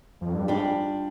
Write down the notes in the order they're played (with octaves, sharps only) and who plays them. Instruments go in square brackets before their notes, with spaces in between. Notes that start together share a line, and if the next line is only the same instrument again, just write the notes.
[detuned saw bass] F2
G2
[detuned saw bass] G#2 [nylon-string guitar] G3 D4 F4